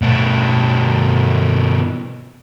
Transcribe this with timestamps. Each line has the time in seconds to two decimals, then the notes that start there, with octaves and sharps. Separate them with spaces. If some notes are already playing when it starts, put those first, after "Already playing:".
0.02 B2 A3